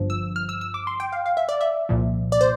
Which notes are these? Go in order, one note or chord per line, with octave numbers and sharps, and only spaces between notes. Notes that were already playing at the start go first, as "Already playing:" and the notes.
Already playing: G1 G2 F3
E6
F6
E6
E6
D6
C6
G5
F5
F5
E5
D5
E5
C2 A#2 F3
D5
C5